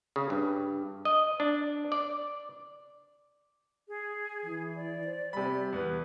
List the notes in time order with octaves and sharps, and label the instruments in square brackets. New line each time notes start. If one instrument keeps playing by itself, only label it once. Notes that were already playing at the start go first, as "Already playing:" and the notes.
[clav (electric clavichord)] C#3
G2
D#5
D4
D5
[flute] G#4
[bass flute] E3
[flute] D5
[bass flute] C5
[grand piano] C3 B5 [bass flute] G3
[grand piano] E2 B4